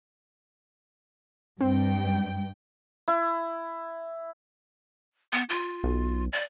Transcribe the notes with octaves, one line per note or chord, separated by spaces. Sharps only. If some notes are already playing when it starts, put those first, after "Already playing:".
G2 C4 G5
E4
B3
F4
B1
D5